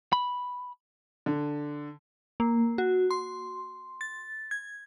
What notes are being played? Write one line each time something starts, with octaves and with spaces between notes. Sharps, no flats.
B5
D3
A#3
F#4
C6
A6
G#6